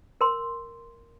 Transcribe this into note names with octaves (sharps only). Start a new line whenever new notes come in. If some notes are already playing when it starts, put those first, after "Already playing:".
A#4 C6